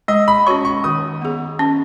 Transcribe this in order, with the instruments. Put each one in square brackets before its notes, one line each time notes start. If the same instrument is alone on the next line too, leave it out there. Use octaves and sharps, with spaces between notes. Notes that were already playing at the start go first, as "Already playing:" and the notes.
[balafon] G#3 [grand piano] D#5
[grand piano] B5
[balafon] C#4 F#4 C#5 [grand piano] C#6
[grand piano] C#6
[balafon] D#3 [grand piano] D#6
[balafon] B3 G#4
C#4